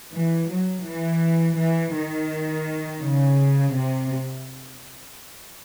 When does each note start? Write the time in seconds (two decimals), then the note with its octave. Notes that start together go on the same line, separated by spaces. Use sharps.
0.13 E3
0.49 F#3
0.85 E3
1.57 E3
1.93 D#3
3.02 C#3
3.74 C3